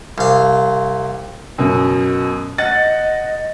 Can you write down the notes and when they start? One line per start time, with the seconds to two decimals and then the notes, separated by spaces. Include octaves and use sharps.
0.18 C2 F5
1.58 F#2 B2
2.58 D#5 F#5 A6